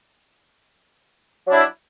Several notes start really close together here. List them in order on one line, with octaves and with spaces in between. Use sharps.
F#3 D4 E4